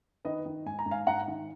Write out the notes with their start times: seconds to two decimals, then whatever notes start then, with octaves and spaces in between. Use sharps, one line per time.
0.25 D#3 B4 D#5
0.46 D#3
0.66 G#2 G#5
0.79 A#5
0.86 G#2
0.91 F5 G#5
1.07 G#2 F#5 A#5
1.28 D#3